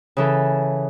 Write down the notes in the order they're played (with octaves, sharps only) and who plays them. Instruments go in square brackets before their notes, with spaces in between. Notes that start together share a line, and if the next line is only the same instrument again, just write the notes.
[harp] C#3 E3 A4